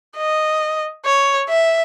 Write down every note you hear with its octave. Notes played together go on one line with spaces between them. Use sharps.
D#5
C#5
E5